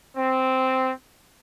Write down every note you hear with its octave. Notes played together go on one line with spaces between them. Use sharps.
C4